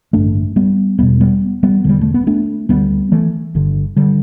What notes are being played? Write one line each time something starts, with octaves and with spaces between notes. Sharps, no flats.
A1 G2 D3 A3 D4
G3 B3
E1 E2 B2 G3 B3
G3 B3
G3 B3
E1 E2 D3 G3
A3
B3
A3 D4
D2 D3 G3 B3
E3 A3
G1 G2 D3
D3 G3